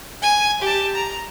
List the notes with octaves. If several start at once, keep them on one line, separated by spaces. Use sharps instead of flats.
G#5
G4 A5
A#5